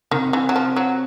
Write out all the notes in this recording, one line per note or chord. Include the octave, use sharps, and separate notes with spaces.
C3 D#3
E3
F#3
F3
F#3